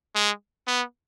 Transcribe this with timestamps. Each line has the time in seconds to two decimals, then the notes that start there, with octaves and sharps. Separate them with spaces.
0.15 G#3
0.67 B3